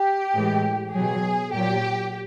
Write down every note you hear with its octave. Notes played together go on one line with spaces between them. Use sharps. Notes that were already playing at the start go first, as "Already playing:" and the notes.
Already playing: G4
A2 E3 G#3
B2 F#3 G#4
A#2 F#3 G4